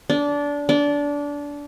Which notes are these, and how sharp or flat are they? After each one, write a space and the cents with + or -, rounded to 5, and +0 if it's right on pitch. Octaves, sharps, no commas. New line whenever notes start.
D4 -20
D4 -20